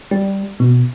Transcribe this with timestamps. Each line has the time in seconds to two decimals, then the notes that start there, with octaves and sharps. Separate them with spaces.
0.11 G3
0.60 B2